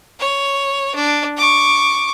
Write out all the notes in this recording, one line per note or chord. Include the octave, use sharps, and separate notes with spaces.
C#5
D4
C#6 D6